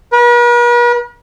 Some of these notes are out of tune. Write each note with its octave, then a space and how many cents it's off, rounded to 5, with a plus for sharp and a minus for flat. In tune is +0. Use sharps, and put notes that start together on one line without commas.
B4 -45